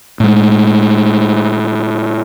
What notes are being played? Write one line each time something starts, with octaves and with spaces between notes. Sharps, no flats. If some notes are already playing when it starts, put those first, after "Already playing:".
A2 G#3